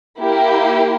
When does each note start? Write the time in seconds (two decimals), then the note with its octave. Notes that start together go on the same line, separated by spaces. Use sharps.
0.19 A#3 E4 G4